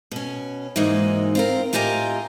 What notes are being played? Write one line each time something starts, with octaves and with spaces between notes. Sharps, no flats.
B2 C#4
G#2 E3 G#3 A#3 D#4 F#4
C4 F4 A#4
A2 F4 G4 D#5 G#5 A#5